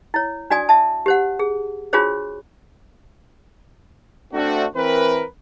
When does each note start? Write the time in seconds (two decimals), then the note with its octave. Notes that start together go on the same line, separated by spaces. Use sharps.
0.14 E4 C#5
0.50 D4 F#4 D5 G#5 D#6
0.69 E5 A5
1.06 G4 C5 F#5
1.39 G#4
1.93 D4 F4 F#4 G#4 C5 C#5
4.33 A3 C4 D4 F#4
4.76 E3 C4 A#4 B4